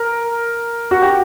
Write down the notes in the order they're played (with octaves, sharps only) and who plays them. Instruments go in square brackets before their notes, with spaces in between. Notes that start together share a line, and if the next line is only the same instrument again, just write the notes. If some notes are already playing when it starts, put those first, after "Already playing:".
Already playing: [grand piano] A#4
F#4
G4